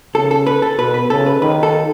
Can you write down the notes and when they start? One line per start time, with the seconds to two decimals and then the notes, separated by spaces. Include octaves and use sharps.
0.14 C#3 A4
0.31 A4
0.47 B4
0.62 A4
0.78 B2 B4
0.94 B4
1.10 C#3 A4
1.26 B4
1.41 D#3 B4
1.63 A4